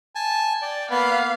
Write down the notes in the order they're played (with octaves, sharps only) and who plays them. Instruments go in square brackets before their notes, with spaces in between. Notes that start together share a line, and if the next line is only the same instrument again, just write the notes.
[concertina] G#5 A5
[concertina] D5 [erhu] G5
[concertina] A#3 B5 [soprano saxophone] B3 [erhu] F5